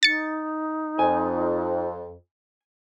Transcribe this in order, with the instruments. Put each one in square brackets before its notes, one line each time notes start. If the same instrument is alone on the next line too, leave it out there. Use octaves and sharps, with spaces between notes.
[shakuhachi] D#4 [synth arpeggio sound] A6 C#7
[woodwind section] F2 [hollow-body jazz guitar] G#5